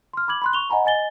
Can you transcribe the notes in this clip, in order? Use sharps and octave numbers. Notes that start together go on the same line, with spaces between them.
C6 F6
B5 D6 G#6 F#7
B5 C6 F#6
C#6 F7 G7
D#5 F#5 G#5 A#5 B5
D#5 G#5 A6 G7